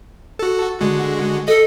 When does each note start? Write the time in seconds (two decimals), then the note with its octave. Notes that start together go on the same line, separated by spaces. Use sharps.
0.39 F#4 A4
0.80 D3 G#3 F#4
1.48 A4 D#5